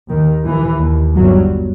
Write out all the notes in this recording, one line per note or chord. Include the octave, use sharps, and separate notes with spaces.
D#2 D#3
D#2 E3
D#2
G1 G2 F#3